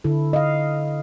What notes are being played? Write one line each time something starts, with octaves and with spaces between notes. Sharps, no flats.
D3 E4 A4
D#5 F5